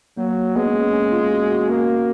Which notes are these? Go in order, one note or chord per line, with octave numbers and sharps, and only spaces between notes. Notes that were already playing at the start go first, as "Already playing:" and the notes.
F#3 A#3
G#3 B3
C#4
B3
C#4
F4
F#4
F#4
A#3